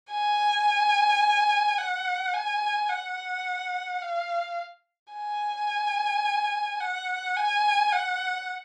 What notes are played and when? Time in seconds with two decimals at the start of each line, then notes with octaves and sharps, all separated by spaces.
0.11 G#5
1.78 F#5
2.34 G#5
2.89 F#5
4.01 F5
5.13 G#5
6.80 F#5
7.36 G#5
7.92 F#5